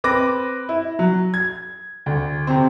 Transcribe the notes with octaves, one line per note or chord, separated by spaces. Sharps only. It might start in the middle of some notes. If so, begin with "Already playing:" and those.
C4 B4 D6 A#6
E4
F#3
G#6
D2
C3 C4